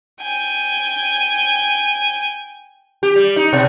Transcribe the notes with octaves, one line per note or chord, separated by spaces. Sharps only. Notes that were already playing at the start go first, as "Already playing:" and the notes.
G5 G#5
G4
G3
D#4
B2